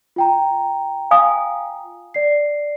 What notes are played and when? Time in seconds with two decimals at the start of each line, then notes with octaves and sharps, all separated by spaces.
0.16 F4 G5 A#5
1.11 F5 G#5 D#6
2.14 D5 C7